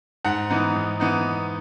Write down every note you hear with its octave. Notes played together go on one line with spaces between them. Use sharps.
G#2 F#5
E3 B3 D#4
G#2
E3 B3 D#4